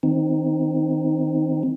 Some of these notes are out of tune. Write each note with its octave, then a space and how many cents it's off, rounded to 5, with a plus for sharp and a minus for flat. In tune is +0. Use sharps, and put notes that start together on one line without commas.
D#3 +20 C4 +0 D#4 +0